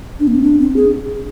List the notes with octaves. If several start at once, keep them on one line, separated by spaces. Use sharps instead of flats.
D4
A#3
C4
D4
C4
G#4